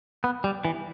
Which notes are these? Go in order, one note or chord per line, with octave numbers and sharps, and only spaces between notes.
B3
G3
E3